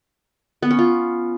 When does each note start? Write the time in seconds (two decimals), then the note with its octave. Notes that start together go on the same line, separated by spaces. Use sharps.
0.62 B3
0.71 C#4
0.79 F4